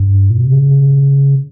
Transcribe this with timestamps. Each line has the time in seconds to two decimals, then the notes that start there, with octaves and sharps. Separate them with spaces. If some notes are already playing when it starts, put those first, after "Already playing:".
Already playing: G2
0.30 A#2
0.38 B2
0.45 C3
0.52 C#3